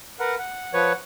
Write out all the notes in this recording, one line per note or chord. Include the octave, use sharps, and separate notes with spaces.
A#4 B4 F#5
F#5
F3 B4 C#5